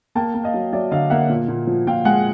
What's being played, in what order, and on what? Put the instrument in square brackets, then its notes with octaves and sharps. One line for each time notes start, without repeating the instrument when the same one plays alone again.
[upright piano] A#3 G5 A5
A#3
D#5 F5
F#3
F#3 D5 E5
D3 D#5 F5
A#3 E5 F#5
A#2
A#2
F3
A#2 F5 G5
G#3 F#5 G#5